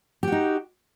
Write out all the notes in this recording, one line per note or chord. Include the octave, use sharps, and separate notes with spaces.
D#4 F#4 G4